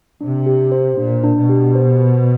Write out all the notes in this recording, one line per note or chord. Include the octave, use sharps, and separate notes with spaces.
C3 D4
G4
C5
A#2 D4
D4
B2
G4
C5